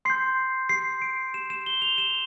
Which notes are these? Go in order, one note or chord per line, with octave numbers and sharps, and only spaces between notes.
C6 G6 C7
C7
D7
E7
E7
G7
F7
E7